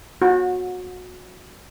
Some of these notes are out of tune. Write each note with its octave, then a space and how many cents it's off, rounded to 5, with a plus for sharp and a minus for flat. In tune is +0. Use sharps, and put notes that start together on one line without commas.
F#4 -25